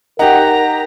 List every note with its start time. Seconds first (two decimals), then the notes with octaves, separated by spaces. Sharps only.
0.19 D#4 G4 A#4 F#5 A#5